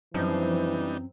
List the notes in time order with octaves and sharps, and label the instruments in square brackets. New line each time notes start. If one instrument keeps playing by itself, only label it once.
[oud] F#2 C4 D#5 [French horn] E3 [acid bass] F3 [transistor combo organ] G3 D4 D#4